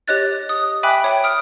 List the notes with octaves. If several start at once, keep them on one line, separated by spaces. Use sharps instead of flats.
G4 C#5 D#5 F#6 A6
D#6
E5 G5 G#5 B5 D6 F#6
C#5 G5
D#6 F6 D7